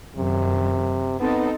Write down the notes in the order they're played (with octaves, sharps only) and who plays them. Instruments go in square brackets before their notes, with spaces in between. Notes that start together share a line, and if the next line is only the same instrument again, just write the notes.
[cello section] F#2 D#3 [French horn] C3
[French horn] B3 [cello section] C4 D#4 A4